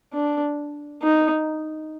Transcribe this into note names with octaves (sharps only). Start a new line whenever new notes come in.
D4
D#4